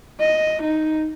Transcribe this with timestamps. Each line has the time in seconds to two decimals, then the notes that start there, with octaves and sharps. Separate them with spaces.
0.20 D#5
0.62 D#4